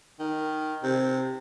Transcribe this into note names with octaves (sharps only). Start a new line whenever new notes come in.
D#3
C3